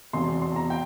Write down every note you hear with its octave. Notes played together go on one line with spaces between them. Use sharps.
E1 E2 C3 C6
C6
A#5
G5